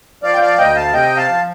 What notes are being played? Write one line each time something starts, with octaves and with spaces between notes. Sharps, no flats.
F3 D5 F5
G5
D5 F5
D2 D#5 G5
F5 A5
C3 D#5 G5
F5 A5
F3